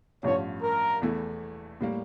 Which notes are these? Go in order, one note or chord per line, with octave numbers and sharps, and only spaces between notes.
A1 G2 F3 C#4 C#5
A#4
E2 E3 A3 E4
A2 G3 A#3